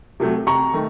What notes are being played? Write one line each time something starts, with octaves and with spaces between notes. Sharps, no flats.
C3 F#3 A3
C3 A#5 C#6
D#3 A3